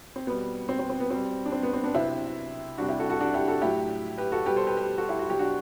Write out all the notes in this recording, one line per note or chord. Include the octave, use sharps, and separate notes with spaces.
C4
B2 G3 B3
C4
C4
C4
B3
B2 G3 C4
D4
C4
B3
C4
B3 D4
C3 F#3 C4 E4
C3 G3 D4 F#4
E4 G4
F#4 A4
F#4 A4
D4 F#4
E4 G4
F#4 A4
A2 F#3 E4 G4
G4 B4
F#4 A4
B2 G3 G4 B4
A4 C5
G4 B4
G4 B4
F#4 A4
E4 G4
F#4
B2 F#3 G4
D4 F#4